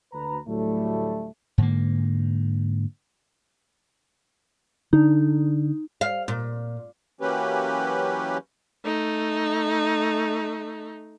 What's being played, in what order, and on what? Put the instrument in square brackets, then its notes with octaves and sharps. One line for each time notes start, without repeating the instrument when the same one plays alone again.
[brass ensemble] D2 B4 A#5
D2 A2 F#3 G3 A3
[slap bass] G#2 D3 A#3
[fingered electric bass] D3 D4 [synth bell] D#4
[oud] F5
A#2
[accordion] E3 F#3 A#3 C#4 G4 B4
[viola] A3 D#4